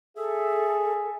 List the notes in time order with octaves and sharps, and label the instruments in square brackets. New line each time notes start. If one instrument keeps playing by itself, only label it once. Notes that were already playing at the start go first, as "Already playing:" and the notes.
[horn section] G#4 E5 [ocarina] A4